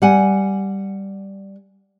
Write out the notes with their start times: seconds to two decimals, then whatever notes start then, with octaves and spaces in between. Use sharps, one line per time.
0.02 G3 F#5 G#5